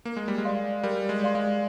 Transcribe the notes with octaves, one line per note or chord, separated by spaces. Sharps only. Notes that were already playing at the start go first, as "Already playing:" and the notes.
A#3 A#4
G#3
G3
G#3
D5 F5 C6
G3 A#4
G#3
D5 F5 C6
G#3